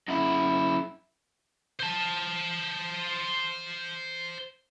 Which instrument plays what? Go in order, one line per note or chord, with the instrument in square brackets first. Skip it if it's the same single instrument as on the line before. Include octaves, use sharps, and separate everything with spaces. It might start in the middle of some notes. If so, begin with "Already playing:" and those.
[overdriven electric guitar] F#2 E4
[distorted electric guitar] C5 A5